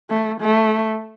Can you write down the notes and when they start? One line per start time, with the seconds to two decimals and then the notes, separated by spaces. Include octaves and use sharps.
0.10 A3
0.41 A3